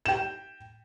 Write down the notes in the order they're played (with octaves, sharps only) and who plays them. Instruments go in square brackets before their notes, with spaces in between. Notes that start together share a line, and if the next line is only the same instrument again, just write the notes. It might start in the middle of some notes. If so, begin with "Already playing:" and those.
[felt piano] G5 E7